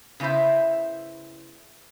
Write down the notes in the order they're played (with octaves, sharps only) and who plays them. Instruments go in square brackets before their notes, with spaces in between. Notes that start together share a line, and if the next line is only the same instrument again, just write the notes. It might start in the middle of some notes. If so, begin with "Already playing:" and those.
[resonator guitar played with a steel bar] C#3 B3 E4 C5 E5